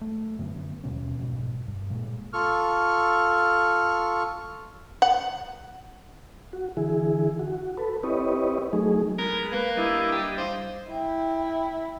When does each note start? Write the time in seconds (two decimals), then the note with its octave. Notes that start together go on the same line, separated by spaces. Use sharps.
0.01 A3
0.39 F#2 D3 B3
0.84 D#2 B2 C#4
1.18 F1 B1 G#2 B2
1.67 G2
1.91 A#2 G#3
2.33 F4 A4 C#6 F6
5.02 F#5
6.53 F#4
6.77 D3 E3 E4 G#4
7.39 F#4
7.77 A4 B4
8.03 C4 E4 G4 B4 C#5 D#5
8.73 F#3 A3 D#4 G#4
9.18 G#3 B3 A#4
9.52 A#3 B4
9.77 G3 D4 E4 D#5
10.12 G4
10.38 C5 F5
10.91 E4 G5